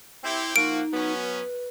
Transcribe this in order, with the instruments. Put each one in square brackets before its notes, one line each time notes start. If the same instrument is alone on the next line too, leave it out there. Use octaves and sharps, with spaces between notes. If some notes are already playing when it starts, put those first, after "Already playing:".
[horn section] C4 E4 G4
[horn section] F3 A#3 F#4 [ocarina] D#4 [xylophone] D7
[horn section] F#3 B3 C#4
[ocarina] B4